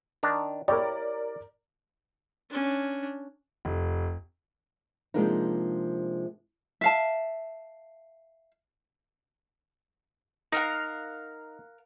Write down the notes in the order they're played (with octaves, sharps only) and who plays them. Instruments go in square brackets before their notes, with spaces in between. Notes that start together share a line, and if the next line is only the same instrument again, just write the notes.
[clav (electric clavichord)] D#3 D4 A#5
[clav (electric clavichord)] E4 G4 C#5 [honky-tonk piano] A#4 D5
[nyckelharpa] C#4 D4
[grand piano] F1
[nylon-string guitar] C3 F3 G#3 A#3 D4 D#4
[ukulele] E5 F5 A5
[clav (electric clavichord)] D#4 [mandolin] A#4 F5 F#5